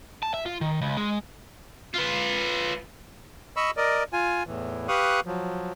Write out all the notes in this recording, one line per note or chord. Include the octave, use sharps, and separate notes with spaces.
A5
E5
F4
D#3
C#2
G#3
F4 B4
D#5 B5 C#6 E6
A#4 D5 D#5
F4 G#5
E2 A2 E3
G4 B4 F5 C#6 D#6 F#6
F3 F#3